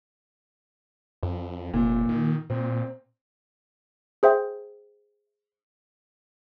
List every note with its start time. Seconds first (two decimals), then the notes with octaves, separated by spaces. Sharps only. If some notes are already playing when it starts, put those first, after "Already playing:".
1.23 F2
1.74 F1 A#2
2.09 D#3
2.50 A#2 C4
4.23 G#4 C5 E5 G5